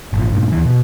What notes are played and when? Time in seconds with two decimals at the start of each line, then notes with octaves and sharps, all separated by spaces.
0.13 G#1 A#2
0.31 G2 A#2
0.52 D#2 E3
0.65 B2